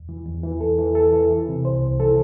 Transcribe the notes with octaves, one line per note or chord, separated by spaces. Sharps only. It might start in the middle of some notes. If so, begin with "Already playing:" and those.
Already playing: E2
E3
E2
E3
E2 A4
E3
E2 A4
E3
E3
C3
C2 C5
C2
E3 A4